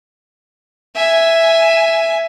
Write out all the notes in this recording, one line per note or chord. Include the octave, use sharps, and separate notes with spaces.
E5 G#5